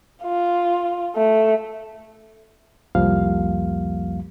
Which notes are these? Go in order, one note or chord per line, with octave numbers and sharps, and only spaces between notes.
F4
A3
C2 F2 F3 G3 A#3 F5